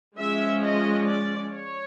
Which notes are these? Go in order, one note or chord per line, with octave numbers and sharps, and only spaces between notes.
F3 G#3 C#4 E5
D#5
D5
C#5